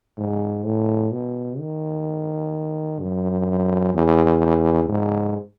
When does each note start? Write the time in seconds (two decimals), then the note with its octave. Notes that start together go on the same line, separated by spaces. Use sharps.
0.18 G#2
0.64 A2
1.12 B2
1.59 D#3
3.00 F#2
3.94 E2
4.89 G#2